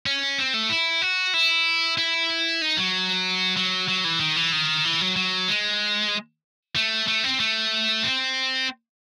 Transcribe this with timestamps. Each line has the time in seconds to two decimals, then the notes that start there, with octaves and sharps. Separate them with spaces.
0.06 C#4
0.38 C4
0.54 A3
0.70 E4
1.02 F#4
1.34 E4
1.98 E4
2.62 D#4
2.77 F#3
3.57 F#3
3.89 F#3
4.05 E3
4.20 D#3
4.36 E3
4.52 D#3
4.85 E3
5.01 F#3
5.16 F#3
5.48 G#3
6.76 A3
7.08 A3
7.24 C4
7.40 A3
8.03 C4